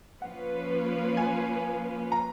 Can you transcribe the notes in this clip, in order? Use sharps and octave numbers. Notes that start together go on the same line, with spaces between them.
F3 A#3 C#4 F4 B4 F#5
G#5
A#5